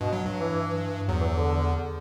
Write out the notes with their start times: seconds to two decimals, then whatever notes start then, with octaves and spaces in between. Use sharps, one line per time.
0.01 G2 B2
0.13 F#3
0.25 G2
0.37 E3
1.08 E2 F#3
1.20 E3
1.32 D3